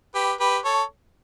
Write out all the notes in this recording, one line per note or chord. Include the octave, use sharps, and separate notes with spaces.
G4 B4
G4 B4
A4 C#5